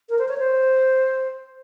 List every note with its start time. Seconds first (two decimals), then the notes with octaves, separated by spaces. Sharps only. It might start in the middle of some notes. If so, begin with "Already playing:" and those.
0.09 A#4
0.18 C5
0.28 C#5
0.38 C5